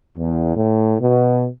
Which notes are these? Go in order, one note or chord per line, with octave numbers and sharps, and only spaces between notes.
E2
A2
B2